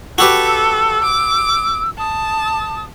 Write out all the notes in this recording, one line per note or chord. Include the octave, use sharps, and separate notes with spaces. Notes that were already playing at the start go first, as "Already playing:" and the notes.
F#4 G4 A4 B4 E6
D6
A5 D#6